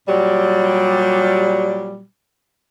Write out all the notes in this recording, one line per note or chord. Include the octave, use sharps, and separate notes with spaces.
A#2 F#3 G3